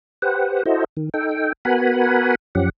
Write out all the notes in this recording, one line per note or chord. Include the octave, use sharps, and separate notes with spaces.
G4 B4 C5 F#5
E4 F#4 A4 C5 D#5
D#3
D#4 A4 G5
B3 F#4 A#4 F#5 G#5 B5
F#2 F3 C#4 G4 F#5